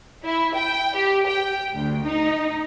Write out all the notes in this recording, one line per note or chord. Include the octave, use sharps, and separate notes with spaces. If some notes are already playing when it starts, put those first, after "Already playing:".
E4
G5
G4
G5
D2
D#4